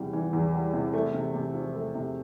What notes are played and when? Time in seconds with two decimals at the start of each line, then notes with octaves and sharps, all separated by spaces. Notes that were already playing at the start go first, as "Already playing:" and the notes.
Already playing: E2 C3 E3 G3
0.13 E3
0.33 E2
0.54 G3
0.73 C3
0.94 A3
1.14 C3
1.34 C3
1.54 F3
1.75 A3
1.95 C3